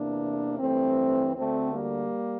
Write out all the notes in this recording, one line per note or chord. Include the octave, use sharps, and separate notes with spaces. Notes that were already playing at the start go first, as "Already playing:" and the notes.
Already playing: E2 C3 E3 A#3 D4
G2 E3 A3 C4
D2 D3 A3 C4
G3 A#3